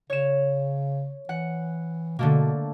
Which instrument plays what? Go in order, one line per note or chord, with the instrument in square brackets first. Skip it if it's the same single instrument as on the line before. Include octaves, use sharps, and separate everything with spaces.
[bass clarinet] C#3 [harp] C#5 E7
[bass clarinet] E3 [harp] F#5
[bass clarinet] B2 [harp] D3 A3 A#3